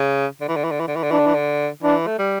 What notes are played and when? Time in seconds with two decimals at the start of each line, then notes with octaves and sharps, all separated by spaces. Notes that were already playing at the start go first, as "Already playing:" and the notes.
Already playing: C#3
0.41 D3
0.48 E3
0.56 D3
0.64 E3
0.71 D3
0.80 E3
0.87 D3
0.96 E3
1.03 D3
1.11 E3 D4
1.19 D3
1.26 E3
1.35 D3
1.83 E3 D4
2.06 A3
2.18 G3